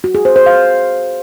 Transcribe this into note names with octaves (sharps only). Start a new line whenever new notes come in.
F#4
G#4
C5
C5
F5